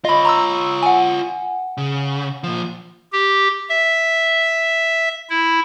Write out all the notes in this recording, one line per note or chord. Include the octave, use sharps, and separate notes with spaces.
F4 C#5 D#5 B5
A#5 C6 E6
F#5 G#5
C#3
A#2 F3
G4
E5
E4